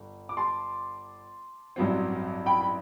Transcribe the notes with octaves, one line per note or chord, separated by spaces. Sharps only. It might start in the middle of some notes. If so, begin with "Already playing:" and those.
Already playing: G1
D6
A5 C6
A1 G2 F#3 C4
G5 B5
B5